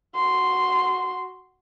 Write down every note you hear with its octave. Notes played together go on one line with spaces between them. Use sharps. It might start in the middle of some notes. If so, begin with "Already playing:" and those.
F#4 C6